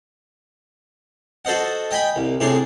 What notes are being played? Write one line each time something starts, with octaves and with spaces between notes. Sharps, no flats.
F#4 A4 C5 D#5 F#5
D#5 G5 G#5 B5
C2
A2 C3 D4 G#4 C6